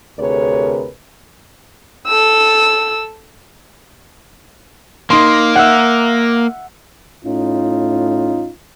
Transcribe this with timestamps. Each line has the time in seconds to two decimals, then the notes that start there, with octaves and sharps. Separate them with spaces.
0.18 D2 C3 G#4 A#4 B4 C#5
2.07 A4 E6
5.10 A#3 D#4 C6
5.56 E5 F#5
7.25 A2 C#4 D#4 F4